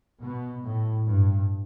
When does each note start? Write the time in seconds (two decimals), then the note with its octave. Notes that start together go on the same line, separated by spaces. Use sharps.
0.22 B2
0.65 A2
1.08 G2